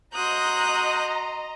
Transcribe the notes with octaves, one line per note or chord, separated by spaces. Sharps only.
F#4 D#5 A#5 C6 D#6 F#6 G6